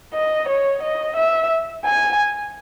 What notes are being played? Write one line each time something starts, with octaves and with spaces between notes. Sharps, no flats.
D#5
C#5
D#5
E5
G#5